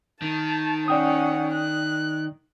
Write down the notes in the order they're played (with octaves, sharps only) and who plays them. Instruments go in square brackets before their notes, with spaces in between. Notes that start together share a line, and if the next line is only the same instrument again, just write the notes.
[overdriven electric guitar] D#3 [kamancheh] A5
[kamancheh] C#4 F#5 [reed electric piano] D5 G5 D#6
[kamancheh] F#6